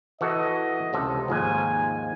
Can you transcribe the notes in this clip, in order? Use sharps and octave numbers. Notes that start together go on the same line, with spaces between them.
E3 F#4 A4 D#5
C#2 C3 A4
D#2 G#2 F3 G#5